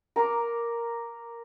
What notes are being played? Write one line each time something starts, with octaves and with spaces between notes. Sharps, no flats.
A#4 A#5 C6 D6